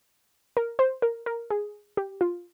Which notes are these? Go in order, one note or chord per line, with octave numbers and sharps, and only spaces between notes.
A#4
C5
A#4
A#4
G#4
G4
F4